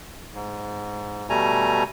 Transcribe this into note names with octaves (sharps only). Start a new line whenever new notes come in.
G#2
B2 G3 A3 G#5 A#5